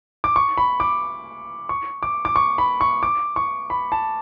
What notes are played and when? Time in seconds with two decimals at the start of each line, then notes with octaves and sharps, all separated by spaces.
0.24 D6
0.36 C#6
0.58 B5
0.80 D6
1.69 C#6
2.03 D6
2.25 D6
2.36 C#6
2.58 B5
2.81 C#6
3.03 D6
3.36 C#6
3.70 B5
3.92 A5